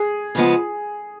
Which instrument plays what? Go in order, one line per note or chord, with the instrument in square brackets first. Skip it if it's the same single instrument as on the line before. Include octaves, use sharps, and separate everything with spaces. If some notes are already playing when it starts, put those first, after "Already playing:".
Already playing: [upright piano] G#4
[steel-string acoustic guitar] C#3 F3 G#3 B3